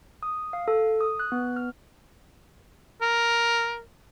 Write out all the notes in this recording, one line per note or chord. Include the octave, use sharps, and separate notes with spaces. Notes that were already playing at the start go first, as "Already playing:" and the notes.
D#6
F5
A4
D#6
F#6
B3
F6
A#4